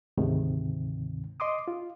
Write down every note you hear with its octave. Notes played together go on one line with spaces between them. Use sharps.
D2 G#2 C3 D#3
D#5 C6 D6 D#6
F4